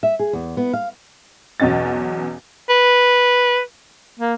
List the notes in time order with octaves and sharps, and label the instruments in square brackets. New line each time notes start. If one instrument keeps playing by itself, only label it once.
[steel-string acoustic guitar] E5
G#4
E2
B3
F5
[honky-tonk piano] B1 E2 B2 C#4 D#5 A6
[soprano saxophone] B4
A#3